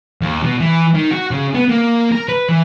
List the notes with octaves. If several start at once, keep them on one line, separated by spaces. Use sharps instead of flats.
D#2
B2
E3
D#3
F#4
C#3
B3
A#3
A#4
B4
E3